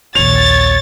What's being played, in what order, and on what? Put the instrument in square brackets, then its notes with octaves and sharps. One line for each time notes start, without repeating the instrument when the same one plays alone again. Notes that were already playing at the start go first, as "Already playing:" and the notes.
[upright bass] A#1 D#2 [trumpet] C#5 [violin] A6 [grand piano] F7